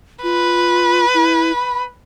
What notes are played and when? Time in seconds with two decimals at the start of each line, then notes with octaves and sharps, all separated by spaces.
0.23 F4 B4
1.14 E4
1.56 B5